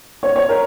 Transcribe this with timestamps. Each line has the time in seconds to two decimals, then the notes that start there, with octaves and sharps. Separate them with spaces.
0.23 C#5
0.36 C#5
0.49 A#4